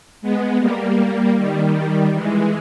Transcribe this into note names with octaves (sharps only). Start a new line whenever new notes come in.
G#3 B3
G3 A#3
D#3 G3
E3 G#3